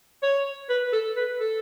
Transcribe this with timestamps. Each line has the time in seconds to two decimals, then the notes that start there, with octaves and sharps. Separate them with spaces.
0.23 C#5
0.69 B4
0.93 A4
1.16 B4
1.40 A4